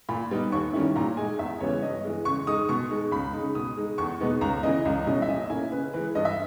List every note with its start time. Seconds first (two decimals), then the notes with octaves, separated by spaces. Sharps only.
0.09 A#2 B5
0.31 G3 B3 D#4
0.52 D#2 C#6
0.73 D#3 G3 C#4 E4
0.96 A#2 A#5
1.17 G#3 D#4 G#5
1.38 E2 E5
1.60 C#3 E3 G3 B3 C#5
1.82 G2 D#5
2.04 E3 G#3
2.25 C#3 C#6
2.47 G#3 D#4 D#6
2.69 B2 C#6
2.91 G#3 D#4
3.11 C#2 B5
3.33 C#3 G#3 D#4
3.55 B2 D#6
3.77 G#3 D#4
3.98 E2 C#6
4.20 B2 G#3 B3 D#4
4.41 C#2 A#5
4.63 C#3 E3 D#5
4.85 C#2 D#5
5.06 B2 G3 C#4 E4 D#5
5.22 E5
5.28 A#2 D#5
5.50 A#3 C#4 E4 G#5
5.72 C#3 B4
5.93 E3 G#3 B4
6.15 G2 D#5
6.25 E5